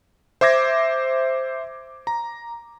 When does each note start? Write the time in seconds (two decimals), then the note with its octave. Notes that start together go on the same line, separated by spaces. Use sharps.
0.41 C5 E5 D6 G#6 A#6
2.07 A#5